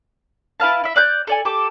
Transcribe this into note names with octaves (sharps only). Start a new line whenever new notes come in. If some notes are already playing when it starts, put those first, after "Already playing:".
E4 B4 F5 A5
E4 E5
D5 F#6 G6
A4 D5 G#5
G4 A4 D6